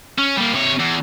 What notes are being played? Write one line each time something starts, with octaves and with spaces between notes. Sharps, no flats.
C#4
G3 A#3
C3 C#5
E2